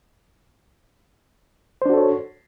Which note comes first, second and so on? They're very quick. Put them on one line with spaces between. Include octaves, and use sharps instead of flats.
C5 D4 F#4 A4 C#5